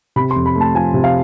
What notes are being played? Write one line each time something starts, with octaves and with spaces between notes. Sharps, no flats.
C3 B5
C6
F2
B5
A3
A5
F3 G#5
C3
F5